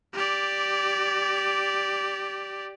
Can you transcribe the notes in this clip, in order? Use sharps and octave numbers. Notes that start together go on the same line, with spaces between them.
G4 D5